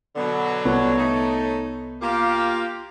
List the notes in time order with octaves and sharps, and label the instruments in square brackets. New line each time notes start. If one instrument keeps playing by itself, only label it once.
[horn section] B2 D3 F#3 [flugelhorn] B3
[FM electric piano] C2 [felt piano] B3 [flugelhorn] C#5
[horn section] A3 D#4
[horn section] A#3 G4 [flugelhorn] F4